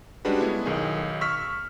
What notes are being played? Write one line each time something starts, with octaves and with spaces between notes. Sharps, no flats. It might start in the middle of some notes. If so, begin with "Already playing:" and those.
G3 G#3 C#4 D4 F#4 B4
G#3 A3 B3 E4
B1 D#3 G#4
C#6 E6 F6 B6